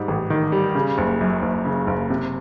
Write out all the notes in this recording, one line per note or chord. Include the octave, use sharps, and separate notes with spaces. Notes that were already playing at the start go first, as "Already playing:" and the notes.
Already playing: G#2 G3
A1
D#3
G3
C#3
F#1
F#2
F#1
C#3
F#1
C3